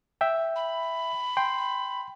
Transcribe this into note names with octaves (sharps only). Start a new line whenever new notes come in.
E5 G5
B5
G5 C6